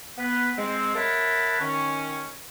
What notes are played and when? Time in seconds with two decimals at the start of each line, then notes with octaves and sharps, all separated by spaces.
0.18 B3 B4
0.57 G#3 C4
0.95 A#4 C#5 E5 F#5 A5 B5
1.60 D#3 C#4